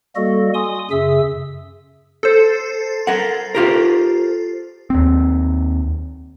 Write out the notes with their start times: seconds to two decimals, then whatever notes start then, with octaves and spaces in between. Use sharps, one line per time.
0.16 G3 A#3 F#4 A4 D#5
0.54 G#5 C6 D#6
0.91 F#2 C#3 G#4 E5 E6
2.23 A4 C5
3.07 A#4 F#5
3.55 F4 G4 A#4
4.90 D#2 C4